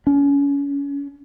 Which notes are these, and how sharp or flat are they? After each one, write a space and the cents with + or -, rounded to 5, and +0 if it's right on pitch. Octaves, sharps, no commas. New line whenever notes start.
C#4 +30